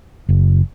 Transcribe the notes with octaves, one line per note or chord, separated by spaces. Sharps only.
F#1